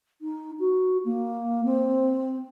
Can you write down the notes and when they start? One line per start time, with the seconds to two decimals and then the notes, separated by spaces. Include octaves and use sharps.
0.21 D#4
0.60 F#4
1.05 A#3
1.65 C4